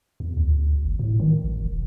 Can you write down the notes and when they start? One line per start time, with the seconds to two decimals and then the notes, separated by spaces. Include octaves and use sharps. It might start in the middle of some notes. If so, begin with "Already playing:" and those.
0.20 E2
0.37 D2
0.84 G1
0.99 A2
1.20 D#3
1.44 A1
1.64 E1